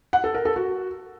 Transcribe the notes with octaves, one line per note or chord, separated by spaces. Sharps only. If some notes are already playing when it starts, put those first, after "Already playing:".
F#5
A4
A#4
A4
F#4